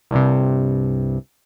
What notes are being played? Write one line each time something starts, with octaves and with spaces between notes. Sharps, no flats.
C2 G2 C3